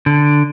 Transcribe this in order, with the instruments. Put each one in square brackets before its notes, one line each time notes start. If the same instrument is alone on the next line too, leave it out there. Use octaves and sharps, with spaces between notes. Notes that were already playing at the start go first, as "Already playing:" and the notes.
[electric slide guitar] D3